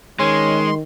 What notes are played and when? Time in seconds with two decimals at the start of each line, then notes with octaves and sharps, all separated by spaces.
0.19 D#3 G#3 C#4 C6